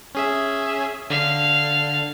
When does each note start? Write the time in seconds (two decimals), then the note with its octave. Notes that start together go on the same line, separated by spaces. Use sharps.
0.15 C#4 G#4 E5
1.10 D3 F5